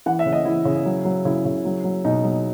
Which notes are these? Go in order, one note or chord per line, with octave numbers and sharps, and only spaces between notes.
E3 F#5
E5
C#3
D#5
E3 E4
C#3
F#3
F#3
C#3 E4
C#3
F#3
F#3
B2 D#4
F#3